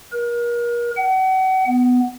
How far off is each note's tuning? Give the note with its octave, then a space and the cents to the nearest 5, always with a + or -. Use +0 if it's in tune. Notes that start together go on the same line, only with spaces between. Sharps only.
A#4 +35
F#5 +35
B3 +10